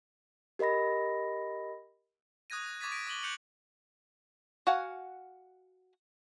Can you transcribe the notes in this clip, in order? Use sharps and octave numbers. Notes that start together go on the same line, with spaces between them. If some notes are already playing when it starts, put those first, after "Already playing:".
G4 A#4 D#5 B5 A#6
C#6 D#6 F#6 G#6 A#6 D#7
F#6
C#6 D6 G#6 A6 B6 D#7
A#6 B6 D7 D#7
D#6 D#7 F#7 G7
F#6 G6 C#7 F7 F#7
F#4 F5 F#5 G#5